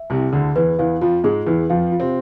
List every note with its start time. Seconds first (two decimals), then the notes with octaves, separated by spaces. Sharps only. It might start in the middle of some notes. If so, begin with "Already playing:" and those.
Already playing: E5
0.10 C2 C3 E4
0.32 D2 D3 G#4
0.56 E2 E3 B4
0.79 E2 E3 F5
1.01 F2 F3 F4
1.24 G#2 G#3 G#4
1.47 E2 E3 B4
1.70 F2 F3 F5
1.92 F4
2.00 C3 C4